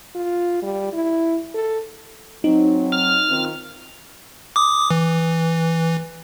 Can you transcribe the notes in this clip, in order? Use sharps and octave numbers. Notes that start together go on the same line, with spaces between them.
F4
G3
E4
A4
F#3 C4 D#4
F6
D#3 C4 F4
D6 D#6
E3